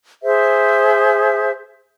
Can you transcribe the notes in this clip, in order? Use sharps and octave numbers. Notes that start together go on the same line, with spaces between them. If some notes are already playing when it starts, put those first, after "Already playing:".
G#4 C5 E5